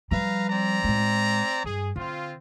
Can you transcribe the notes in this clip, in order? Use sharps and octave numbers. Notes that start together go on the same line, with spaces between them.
F3 G3 B4 F5 A#5
C4 D5 A#5
A2 G#3
G2 G#4
D3 C4 F4